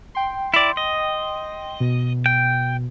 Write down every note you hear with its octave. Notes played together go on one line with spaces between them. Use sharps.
G5 C6
E4 D5
D#5
B2
G5